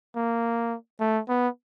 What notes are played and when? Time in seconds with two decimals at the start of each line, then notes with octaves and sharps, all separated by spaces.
0.16 A#3
1.00 A3
1.28 B3